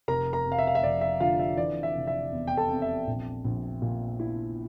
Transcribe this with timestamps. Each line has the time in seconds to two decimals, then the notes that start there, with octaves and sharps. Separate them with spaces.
0.08 F1 A#4 A#5
0.33 A#4 A#5
0.45 F2
0.52 F5
0.58 E5
0.67 F5
0.75 E5
0.83 F1 D5
1.01 E5
1.20 D3 F4 F5
1.39 E5
1.57 E3 D5
1.83 E5
1.95 F1
2.07 E5
2.32 E2
2.47 G5
2.57 A4 A5
2.70 C3
2.82 E5
3.07 A#1
3.44 A#1
3.82 A#2
4.19 E4